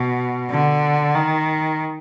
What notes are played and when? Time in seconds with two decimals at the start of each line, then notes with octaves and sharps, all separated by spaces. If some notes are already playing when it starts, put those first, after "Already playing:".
Already playing: B2
0.50 D3
1.15 D#3